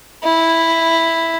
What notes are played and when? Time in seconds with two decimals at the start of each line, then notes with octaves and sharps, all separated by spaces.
0.24 E4